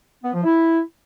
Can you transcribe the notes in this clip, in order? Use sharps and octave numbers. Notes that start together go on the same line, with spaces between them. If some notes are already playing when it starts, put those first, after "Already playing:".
B3
F3
E4